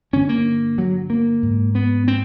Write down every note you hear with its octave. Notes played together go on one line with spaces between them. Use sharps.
G2 D3 C#4
A#3
F#3
A#3
G#2
B3
C4